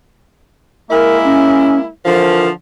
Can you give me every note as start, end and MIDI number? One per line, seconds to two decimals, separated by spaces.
0.90 1.86 56
0.90 1.86 58
0.90 1.86 64
0.90 1.18 70
1.24 1.78 61
2.05 2.48 50
2.05 2.48 52
2.05 2.48 53
2.05 2.48 70